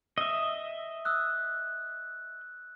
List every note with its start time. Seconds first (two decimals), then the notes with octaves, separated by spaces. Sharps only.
0.18 D#5 E5
1.05 D#6 E6 F#6